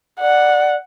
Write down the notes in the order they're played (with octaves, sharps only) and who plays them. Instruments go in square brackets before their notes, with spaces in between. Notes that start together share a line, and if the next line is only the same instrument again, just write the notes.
[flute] D5 [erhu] F#5